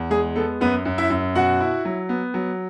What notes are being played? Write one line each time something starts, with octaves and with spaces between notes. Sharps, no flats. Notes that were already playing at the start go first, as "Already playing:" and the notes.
Already playing: E2
G#3 G#4
B3 A4
F#2 B3 B4
F#2
E4 E5
F#2
B2 F#4 F#5
E4
F#3
B3
F#3